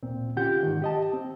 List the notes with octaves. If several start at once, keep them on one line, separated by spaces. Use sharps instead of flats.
D2 A#2 C4
D3 C#4 F4 G4 F#5 G6
G#2 D#3
G4 D#5 A5
C4